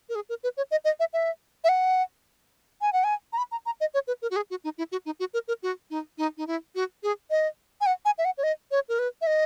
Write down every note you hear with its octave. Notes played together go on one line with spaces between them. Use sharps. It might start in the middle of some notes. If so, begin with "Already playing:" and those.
A#4
G#4
A#4
B4
C#5
D#5
D#5
E5
E5
E5
F#5
G#5
F#5
G#5
A#5
B5
A#5
A#5
D#5
C#5
B4
A#4
F#4
G#4
F#4
D#4
E4
F#4
D#4
F#4
A#4
A#4
F#4
D#4
D#4
D#4
E4
F#4
G#4
D#5
G#5
F#5
G#5
E5
F#5
C#5
D#5
C#5
A#4
B4
E5
D#5